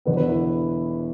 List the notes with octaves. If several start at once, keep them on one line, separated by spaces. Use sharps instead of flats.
E1 E2 D3 B3 B4
B4
E4